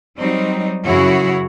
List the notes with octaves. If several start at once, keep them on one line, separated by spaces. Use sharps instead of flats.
F#3 G3 C4 D#4
F#2 C#3 E4 F#4 G#4 C#5